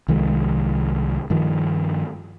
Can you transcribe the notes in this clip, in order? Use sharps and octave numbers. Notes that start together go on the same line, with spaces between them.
C2 D#3 F3 G#3
G2 D#3 F3